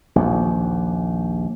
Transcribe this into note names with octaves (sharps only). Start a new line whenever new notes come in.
A#1 D#2